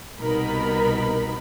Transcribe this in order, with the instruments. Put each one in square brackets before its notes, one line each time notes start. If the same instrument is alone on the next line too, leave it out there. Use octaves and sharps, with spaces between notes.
[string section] C2 B2 B3 D#4 A#4 B5